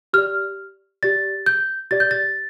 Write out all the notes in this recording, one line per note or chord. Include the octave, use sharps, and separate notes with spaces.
G4 D5 F6
G4 D5 A6
G6
G4 D5 A6
G6
A6